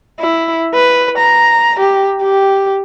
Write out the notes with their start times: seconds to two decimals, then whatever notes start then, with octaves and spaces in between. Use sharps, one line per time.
0.20 E4
0.75 B4
1.18 A#5
1.80 G4
2.23 G4